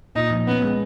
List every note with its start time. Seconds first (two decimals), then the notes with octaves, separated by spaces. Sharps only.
0.15 A#2 D#4
0.31 F3
0.47 B3 C#4
0.63 G#3